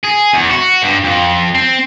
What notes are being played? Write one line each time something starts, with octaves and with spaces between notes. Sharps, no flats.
G#4
E2
F#4
G2
F2
C4